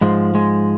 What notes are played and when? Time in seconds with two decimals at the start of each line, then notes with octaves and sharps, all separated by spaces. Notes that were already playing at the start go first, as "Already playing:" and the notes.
0.01 G#2 F3 G#3
0.35 G#3